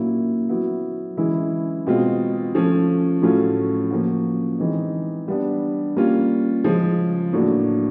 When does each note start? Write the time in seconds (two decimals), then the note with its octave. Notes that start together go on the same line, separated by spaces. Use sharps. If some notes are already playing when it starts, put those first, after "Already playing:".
Already playing: A#2 F#3 A#3 C#4 E4
0.49 F#3 B3 E4
1.17 E3 G#3 C#4 E4
1.87 B2 G#3 C4 F4
2.55 F3 A3 C#4
3.22 A2 F#3 A3 C#4 F4
3.91 F3 A#3 C#4 F#4
4.59 E3 G#3 C4 D#4
5.28 G3 B3 D4
5.97 G3 A#3 C#4 F4
6.64 C#3 F3 G#3
7.33 A2 F#3 A#3 D4